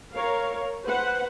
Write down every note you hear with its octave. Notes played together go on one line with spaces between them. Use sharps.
A#4 C#5 F5
B4 C5 F#5